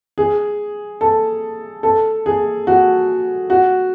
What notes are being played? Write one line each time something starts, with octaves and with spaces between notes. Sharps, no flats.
G#4
A4
A4
G#4
F#4
F#4